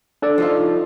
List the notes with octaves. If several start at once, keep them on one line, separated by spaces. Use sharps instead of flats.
D4 A4 D5
F3 D#4 F4